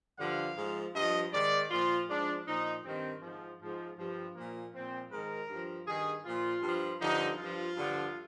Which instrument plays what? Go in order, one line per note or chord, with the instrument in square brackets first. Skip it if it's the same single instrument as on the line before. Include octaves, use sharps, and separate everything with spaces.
[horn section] G2 D3 F3 F5
G#2 F3
G2 F3 D#5
G#2 D#3 D5
A#2 F3 F4
G#2 F3 D4
A#2 F3 D#4
G2 D#3 C4
G#2 F3
G#2 F3
G2 F3
A#2 F3 A#3
A#2 F3 C4
G#2 A#4
D#3
G2 F3
G2 D#3 G#4
A#2 F3 F4
G2 F3
G2 D3 F3 D#4
G2 F3 F4
G2 D3 F3